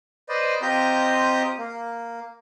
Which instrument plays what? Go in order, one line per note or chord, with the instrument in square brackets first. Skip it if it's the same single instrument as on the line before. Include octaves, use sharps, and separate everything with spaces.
[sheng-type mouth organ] B4 C5 D5 D#5
C4 F4 G4 D#5 A#5 G6
A#3